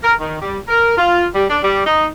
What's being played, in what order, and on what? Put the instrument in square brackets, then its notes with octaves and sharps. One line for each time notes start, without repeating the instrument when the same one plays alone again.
[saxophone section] A#4
D#3
G3
A#4
F4
G3
D4
G3
D#4